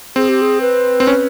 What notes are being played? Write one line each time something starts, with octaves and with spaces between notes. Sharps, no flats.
C4 G#4
G4
G#4
B4
C4
C#4